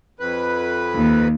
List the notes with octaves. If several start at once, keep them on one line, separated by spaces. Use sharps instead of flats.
F2 B4
D#2